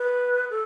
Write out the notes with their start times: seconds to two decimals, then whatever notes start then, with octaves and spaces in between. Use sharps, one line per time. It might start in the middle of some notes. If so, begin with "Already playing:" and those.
Already playing: B4
0.50 A4